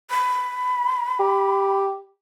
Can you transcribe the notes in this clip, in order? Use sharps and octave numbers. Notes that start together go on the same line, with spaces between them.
B5
G4